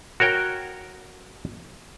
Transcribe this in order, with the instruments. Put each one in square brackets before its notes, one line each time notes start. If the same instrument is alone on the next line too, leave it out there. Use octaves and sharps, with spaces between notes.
[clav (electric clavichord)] F#4 A#4 C#5 G5